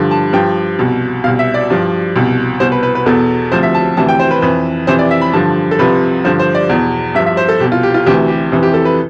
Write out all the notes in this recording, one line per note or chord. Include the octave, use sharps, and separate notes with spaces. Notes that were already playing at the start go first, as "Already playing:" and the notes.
Already playing: G2 D3 F3
A5
G2 F3 G5
C2 B2
C2 B2 F5
E5
D5
G2 F3
C2 B2
C2 B2 C5
B4
B4
B4
E2 B2 A4
D2 C3 F3 C5
E5
A5
D2 C3 E3 A5
G5
C5
B4
F2 E3 B4
F2 C3 E3 C5
D5
E5
B5
G2 D3 F3 A5
A4
C2 C3 F3 B4
G2 D3 F3 C5
C5
D5
E2 B2
G2 F3 E5
E5
C5
A4
C2 B2 G4
F4
G4
F4
D2 C3 E3 G4
G4
F2 C3 E3
G4
A4
B4